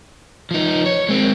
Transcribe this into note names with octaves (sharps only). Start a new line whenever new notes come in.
F3 D#4
C#5
G#3 C4